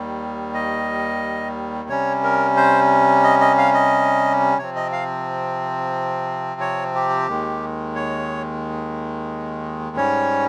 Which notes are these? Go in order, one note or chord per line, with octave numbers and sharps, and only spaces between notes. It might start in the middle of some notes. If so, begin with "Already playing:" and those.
Already playing: D#2 D#3 G3
D#5
C3 G3 C#4 C#5
A#4
C5
D#5
D#5
F5
D#5
C3 F3 C4 C#5
D#5
F5
C#5
G4
D#2 D#3 G#3
C#5
G#2 G3 C#4 C#5